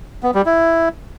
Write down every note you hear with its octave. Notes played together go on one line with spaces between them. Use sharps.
B3
G3
E4